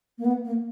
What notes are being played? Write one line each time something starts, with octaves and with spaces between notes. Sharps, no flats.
A#3
B3
A#3